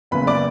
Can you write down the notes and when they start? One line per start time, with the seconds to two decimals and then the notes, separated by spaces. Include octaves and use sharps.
0.11 F#1 E2 C#3 B4 B5
0.27 D5 D6